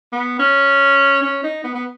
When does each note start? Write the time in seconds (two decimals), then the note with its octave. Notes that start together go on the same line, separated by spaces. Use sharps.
0.13 B3
0.39 C#4
1.22 C#4
1.44 D#4
1.64 B3
1.75 B3